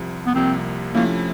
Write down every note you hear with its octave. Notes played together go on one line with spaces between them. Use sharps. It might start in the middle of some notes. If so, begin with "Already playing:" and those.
Already playing: C2 C3 F3
B3
C2 C3 F3 A#3 C4
C3 F3 A3 A#3 C#4 E4